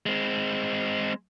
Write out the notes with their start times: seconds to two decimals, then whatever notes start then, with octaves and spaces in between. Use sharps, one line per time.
0.06 G#3 C4